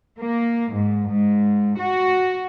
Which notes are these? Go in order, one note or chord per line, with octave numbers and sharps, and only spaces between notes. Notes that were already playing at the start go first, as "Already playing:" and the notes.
A#3
G#2
G#2
F#4